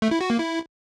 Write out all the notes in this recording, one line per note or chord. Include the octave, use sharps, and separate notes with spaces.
A3
E4
F#4
A#3
E4